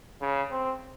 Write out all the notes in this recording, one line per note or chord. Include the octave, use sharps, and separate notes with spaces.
C#3
C4